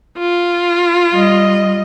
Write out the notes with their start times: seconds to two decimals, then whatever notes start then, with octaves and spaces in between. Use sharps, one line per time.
0.18 F4
1.13 G3 D#5